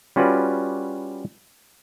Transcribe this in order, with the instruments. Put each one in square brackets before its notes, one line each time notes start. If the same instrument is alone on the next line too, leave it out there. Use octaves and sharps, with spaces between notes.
[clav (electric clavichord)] G3 C#4 F4 F#4 B4 D5